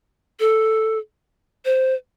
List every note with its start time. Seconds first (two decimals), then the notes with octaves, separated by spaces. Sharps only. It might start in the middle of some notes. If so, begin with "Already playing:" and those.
0.40 A4
1.65 C5